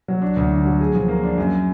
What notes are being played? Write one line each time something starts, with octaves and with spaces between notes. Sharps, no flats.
F#3
D4
D2
D3
F#3
G#4
F3
A#3
D4
F#2